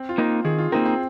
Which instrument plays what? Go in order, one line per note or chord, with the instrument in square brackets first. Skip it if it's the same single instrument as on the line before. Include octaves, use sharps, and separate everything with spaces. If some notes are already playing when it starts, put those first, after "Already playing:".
Already playing: [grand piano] C4
F4
[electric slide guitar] A#3 D#4 A#4
[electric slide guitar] D#3 [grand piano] G#4
[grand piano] F4
[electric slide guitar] A#3 D#4 A#4 [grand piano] C4
[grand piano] C4